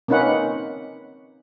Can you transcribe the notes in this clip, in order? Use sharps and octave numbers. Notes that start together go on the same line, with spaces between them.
A#3 C4 C#4 D#4 B4 F#5